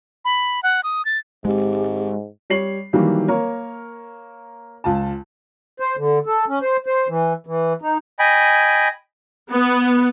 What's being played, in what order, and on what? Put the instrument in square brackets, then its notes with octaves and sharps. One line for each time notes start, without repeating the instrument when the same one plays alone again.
[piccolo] B5
F#5
D#6
A6
[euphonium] G#2 [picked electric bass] G#3 C4 [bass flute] G4
[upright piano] G3 C#5 C7 F#7
D#3 E3 F#3 G3 A#3
A#3 A#4 C#5
C#2 F4 A5
[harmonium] C5
D3
A4
C#4
C5
C5
E3
E3
D#4
[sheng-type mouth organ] D#5 G5 G#5 B5
[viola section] B3